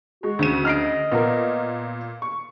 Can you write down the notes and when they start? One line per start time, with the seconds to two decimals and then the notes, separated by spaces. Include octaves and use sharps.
0.23 G#3 F#4
0.39 D2 C#3 D#7
0.65 D#5 F6 C7 D7
1.12 A#2 B3 A#4
2.22 C#6